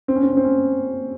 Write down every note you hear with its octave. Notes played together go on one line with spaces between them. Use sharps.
C4
C#4
C4
C#4
C4
C#4